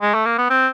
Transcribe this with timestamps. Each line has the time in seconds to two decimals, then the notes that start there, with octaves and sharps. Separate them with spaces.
0.02 G#3
0.14 A3
0.26 A#3
0.38 B3
0.50 C4